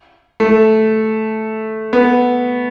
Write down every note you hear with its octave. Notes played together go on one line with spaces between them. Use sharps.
A3
B3